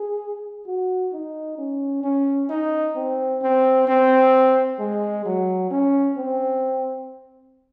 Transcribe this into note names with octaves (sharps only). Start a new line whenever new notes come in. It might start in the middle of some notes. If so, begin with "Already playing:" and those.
Already playing: G#4
F#4
D#4
C#4
C#4
D#4
C4
C4
C4
G#3
F#3
C#4
C4